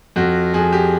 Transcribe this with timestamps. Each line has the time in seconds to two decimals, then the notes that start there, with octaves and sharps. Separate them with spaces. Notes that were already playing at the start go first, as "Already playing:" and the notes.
0.16 F2 F#4
0.54 F2 G#4
0.72 G4